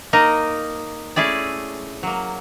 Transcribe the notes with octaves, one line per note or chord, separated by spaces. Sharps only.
A#3 D#4 A#4 D#5 A#5
A3 C#4 E4 G#4 D5
F#3 A#3